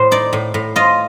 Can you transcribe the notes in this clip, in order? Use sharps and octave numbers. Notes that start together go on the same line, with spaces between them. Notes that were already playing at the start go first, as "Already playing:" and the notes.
Already playing: A2 C5
D#4 D5
A2
A2
F4 D#5